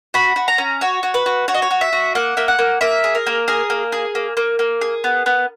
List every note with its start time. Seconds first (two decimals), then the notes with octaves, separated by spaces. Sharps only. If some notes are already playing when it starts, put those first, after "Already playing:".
0.14 F#4 B5
0.36 F#4
0.48 A#5
0.58 C#4
0.81 F#4 C#5
1.03 F#4
1.14 B4
1.26 F#4
1.48 F#4 C#5
1.54 D#5
1.62 C#5
1.71 F#4
1.81 E5
1.93 F#4
2.15 A#3 F#5
2.37 A#3 E5
2.48 F#5
2.59 A#3
2.81 A#3 E5
3.04 G#4
3.15 A#4
3.27 A#3
3.48 G#4 A#4
3.70 A#3
3.92 G#4
4.15 A#3
4.37 A#3
4.59 A#3
4.81 G#4
5.04 B3
5.26 B3